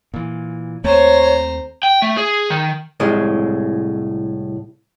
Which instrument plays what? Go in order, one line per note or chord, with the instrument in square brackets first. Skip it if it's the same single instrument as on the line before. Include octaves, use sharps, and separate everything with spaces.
[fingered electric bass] A#2 E3
[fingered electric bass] D#2 A3 C4 [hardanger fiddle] C5 A#5 [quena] C#5
[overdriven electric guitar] G5
A3
G#4
D#3
[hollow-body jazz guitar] C2 A2 G#3